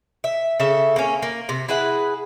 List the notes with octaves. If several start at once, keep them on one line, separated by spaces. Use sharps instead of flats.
E5
C#3 A4 E5
A#3 C#4
A#3
C3
E4 G#4 B4 F#5